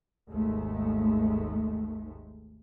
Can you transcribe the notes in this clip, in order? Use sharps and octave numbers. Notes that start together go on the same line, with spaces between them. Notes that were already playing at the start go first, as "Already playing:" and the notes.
G#1 D#2 G#3 A3